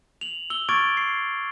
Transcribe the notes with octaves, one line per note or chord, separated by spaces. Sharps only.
F7 F#7
E6 G7
C#6 D6 F6 G#6 A6 D7
C7